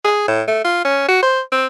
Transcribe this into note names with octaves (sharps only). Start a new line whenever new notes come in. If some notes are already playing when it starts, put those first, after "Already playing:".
G#4
A2
A3
F4
C#4
F#4
C5
C4